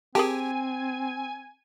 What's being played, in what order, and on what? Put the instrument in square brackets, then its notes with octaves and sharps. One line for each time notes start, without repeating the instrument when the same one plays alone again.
[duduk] C4 [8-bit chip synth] G4 [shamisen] G#4 A#4 A5 [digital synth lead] G#5